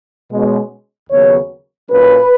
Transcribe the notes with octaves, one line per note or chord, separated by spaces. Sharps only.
B2 G#3 C#4
D#2 C#3 F#3 B3 C#5
A#2 F#3 C#4 B4